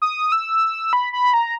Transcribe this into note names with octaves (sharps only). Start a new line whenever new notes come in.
D#6
E6
B5
B5
A#5